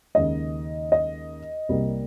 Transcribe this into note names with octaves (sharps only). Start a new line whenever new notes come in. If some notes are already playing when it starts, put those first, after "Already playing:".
D#2 C#3 G#3 D#5
D#5
C2 C3 G3 A#3